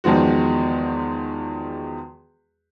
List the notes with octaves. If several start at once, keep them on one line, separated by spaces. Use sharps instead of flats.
E2 D#3 F3 G#3 F#4